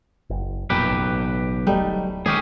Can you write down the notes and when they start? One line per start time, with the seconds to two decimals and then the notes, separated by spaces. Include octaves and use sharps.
0.30 F#1
0.70 B1 F2 A#2 G4 B4
0.90 A1
1.67 D1 F#3 G3 A3 D#4
2.26 D#3 G#3 C#4 G4 G#4